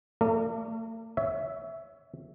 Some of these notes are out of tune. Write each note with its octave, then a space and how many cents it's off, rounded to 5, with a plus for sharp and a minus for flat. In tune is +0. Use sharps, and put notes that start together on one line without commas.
A3 +40 A#4 -35 D5 +0
C#5 +25 E5 +0